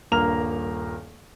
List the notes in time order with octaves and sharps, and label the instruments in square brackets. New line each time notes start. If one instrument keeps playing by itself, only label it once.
[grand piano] D#1 G2 A#3 A#5 F6 F7